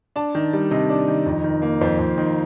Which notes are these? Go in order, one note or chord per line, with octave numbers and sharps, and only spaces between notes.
D4 A5
D#3
G3
C3 D#5
D4
D#3
F2
D#3
A#3
F2 C5
F2
D#3